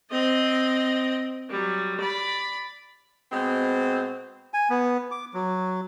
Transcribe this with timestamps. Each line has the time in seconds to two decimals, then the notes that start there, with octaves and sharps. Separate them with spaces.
0.11 C4 D#5
1.50 F#3 G3
2.00 D5 B5
3.32 B2 G#3 C4
4.54 G#5
4.70 B3
5.11 D6
5.34 F#3